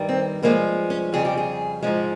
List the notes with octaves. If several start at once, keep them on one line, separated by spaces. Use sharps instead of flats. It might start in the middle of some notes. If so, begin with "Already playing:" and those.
Already playing: G2 D#3 G3
C4
G2 F3 G#3 A#3
C#4
F2 C#3 G3 G#4
G4
G#4
G#2 F3 G#3